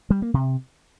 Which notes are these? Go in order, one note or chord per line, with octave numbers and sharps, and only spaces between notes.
G3
A#3
C3